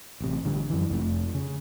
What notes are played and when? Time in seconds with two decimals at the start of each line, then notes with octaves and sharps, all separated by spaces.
0.20 A1 C3
0.44 A1 D3 G3
0.70 F#2 E3
0.89 F1 F2 C3 A3
1.34 C#3